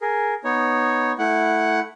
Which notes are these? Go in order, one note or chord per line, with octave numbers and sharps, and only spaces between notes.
G#4 A#4
B3 D#4 C#5
A3 E4 F#5